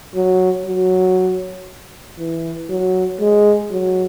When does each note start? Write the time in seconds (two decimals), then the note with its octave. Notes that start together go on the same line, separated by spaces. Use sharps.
0.15 F#3
0.66 F#3
2.18 E3
2.69 F#3
3.20 G#3
3.71 F#3